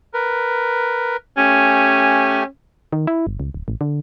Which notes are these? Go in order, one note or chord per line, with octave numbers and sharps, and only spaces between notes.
A#4 B4
A3 C#4 G4 G#5
D#3
E4
G1
C#2
D1
A1
D3